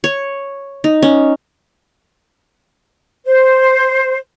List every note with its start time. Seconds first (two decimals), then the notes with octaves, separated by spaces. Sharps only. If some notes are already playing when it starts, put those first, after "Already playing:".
0.04 C#5
0.84 D#4
1.02 C#4
3.26 C5